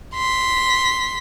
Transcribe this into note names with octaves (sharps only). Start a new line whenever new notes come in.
C6 B6